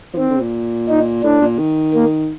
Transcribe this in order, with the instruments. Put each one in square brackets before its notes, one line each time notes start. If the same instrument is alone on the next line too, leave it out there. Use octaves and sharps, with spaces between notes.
[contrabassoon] F3
[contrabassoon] D#3 [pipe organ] C4
[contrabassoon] D3
C3
A#2
[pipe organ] D#4
[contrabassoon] A2 [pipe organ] D4
[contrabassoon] A#2
D#3
[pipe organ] A#3